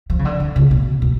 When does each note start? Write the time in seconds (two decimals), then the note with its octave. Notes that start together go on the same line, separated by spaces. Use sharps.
0.10 F3
0.19 C#3
0.25 D3
0.40 D3
0.56 C#3
0.71 B2
1.02 B2